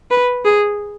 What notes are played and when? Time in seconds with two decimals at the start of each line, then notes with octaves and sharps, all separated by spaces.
0.11 B4
0.45 G#4